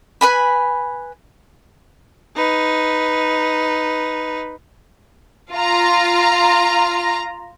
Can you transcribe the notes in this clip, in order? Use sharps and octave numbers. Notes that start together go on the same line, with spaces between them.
B4 G#5 B5
D#4 B4
F4 A#5